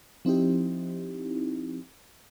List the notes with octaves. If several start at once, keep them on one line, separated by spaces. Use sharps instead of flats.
F3 C4 D#4 E4 G4